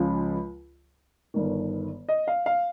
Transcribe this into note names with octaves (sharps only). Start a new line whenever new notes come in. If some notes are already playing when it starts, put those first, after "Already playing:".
Already playing: C#2 C#3 F3
G1 G2 D#3
D#5
F5
F5